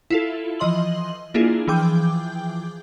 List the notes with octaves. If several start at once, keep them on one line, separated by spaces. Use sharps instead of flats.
E4 F4 A4
E3 F3 D#5 C6 F#7
A#3 D4 E4 F4 G#4
E3 F3 G#4 G5 D6 G6